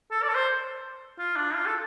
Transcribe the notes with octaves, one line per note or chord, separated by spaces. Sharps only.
A4
D5
A4
C5
F4
D4
F4
A4